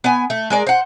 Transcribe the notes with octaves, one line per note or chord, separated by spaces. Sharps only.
B3 G#5
A3
G#3 A#4 D5
C5 F#5